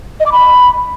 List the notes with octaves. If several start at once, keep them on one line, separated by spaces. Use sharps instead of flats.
D#5
D6
B5